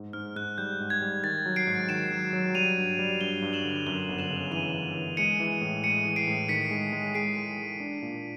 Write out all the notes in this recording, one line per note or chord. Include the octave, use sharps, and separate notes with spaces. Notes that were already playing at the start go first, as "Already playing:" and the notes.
Already playing: G#2
G#2 F6
G#2 F#6
G3 G6
G#2
G#6
G3
D#3 A6
F#3
C7 D7
G#2
D#3 D7 E7
F#3
F#3
G3 D#7 F7
G2
G3
G2 F7 G7
G2
E7 F#7
D3
F#2 F7 G7
G1
E7 F#7
C#3
E3 D#7 F7
G1
E3
G#3 C#7 D#7
E3
A2
G#3 C#7 D#7
E3
C7 D7
A2
D#3 B6 C#7
G#3
G#3
G#3 C7 D7
G#3
G#3
D4
A#2